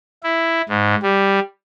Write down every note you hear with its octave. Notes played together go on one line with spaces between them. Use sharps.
E4
G#2
G3